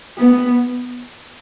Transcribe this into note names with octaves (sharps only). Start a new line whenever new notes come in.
B3